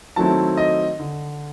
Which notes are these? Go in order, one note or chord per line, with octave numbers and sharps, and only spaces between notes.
D#3 F#3 A3 C4 E4 A5
D#5
D3